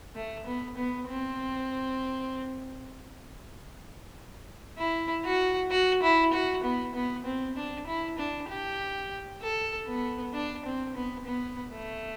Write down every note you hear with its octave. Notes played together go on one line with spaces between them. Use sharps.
A3
B3
B3
C4
E4
F#4
F#4
E4
F#4
B3
B3
C4
D4
E4
D4
G4
A4
B3
D4
C4
B3
B3
A3